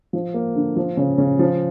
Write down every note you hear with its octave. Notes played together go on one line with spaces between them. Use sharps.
F3
A#3
D3
F3
C#3
C#3
F3